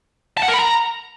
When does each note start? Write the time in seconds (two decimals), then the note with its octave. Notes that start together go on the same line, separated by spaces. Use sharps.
0.37 A5
0.43 F#5
0.48 A#4
0.54 B5
0.59 A#5